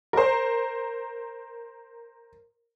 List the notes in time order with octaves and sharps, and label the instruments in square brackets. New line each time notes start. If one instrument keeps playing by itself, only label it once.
[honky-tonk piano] A#4 C5